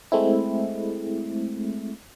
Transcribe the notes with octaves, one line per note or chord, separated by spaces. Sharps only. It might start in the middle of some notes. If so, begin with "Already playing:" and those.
G#3 A3 C4 E4